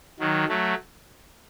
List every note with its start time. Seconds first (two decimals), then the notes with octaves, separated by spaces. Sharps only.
0.20 D#3 F#3
0.48 F#3 A3